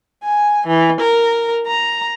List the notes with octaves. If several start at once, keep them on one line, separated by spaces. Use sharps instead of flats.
G#5
E3
A#4
A#5